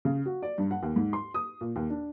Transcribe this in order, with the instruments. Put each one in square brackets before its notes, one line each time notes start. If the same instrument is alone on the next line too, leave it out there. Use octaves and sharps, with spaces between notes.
[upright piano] C#3
F#4
D5
G2
F#5
D#2
G#2
C6
D#6
A#2
D#2
D4